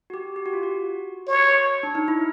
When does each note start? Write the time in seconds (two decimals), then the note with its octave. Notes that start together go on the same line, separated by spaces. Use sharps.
0.10 F#4
0.14 G4
0.36 G4
0.46 F#4
0.53 F4
0.63 F#4
1.28 C#5
1.83 D4
1.95 D#4
2.08 E4